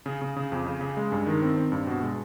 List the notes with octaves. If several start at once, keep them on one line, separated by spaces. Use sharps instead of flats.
C#3
C#3
C#3
F2
C#3
C#3
G#3
G2
D#3
C4
C4
G2
B2
G#3